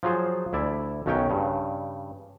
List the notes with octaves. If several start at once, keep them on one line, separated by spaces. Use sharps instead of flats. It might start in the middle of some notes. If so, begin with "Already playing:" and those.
F3 F#3 F4 G#4 C5
D2 E4 D5 E5
B1 D#3 F#3 C#4 C#5 G5
G2 C#3